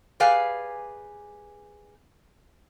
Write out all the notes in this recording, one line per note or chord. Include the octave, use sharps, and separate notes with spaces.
G4 G#4 B4 D5 F5 G#5